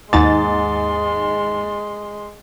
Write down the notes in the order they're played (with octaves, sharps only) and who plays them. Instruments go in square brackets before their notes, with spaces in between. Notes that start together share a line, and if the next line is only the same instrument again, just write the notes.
[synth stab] D#2 D#4 A6 [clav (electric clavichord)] G#2 [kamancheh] G#3 C6